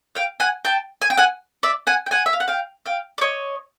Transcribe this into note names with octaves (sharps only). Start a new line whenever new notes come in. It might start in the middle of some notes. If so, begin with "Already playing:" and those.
F5 G5
F#5 G#5
G5 A5
G#5
G5
F#5 G#5
D5 E5
F#5 G#5
G5
F#5 G#5
E5
F5
F#5
F5 G5
F5 G5
D5
C#5 D#5